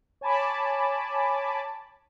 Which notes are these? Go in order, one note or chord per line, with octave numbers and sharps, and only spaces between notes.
C#5 G#5 A5 B5 D6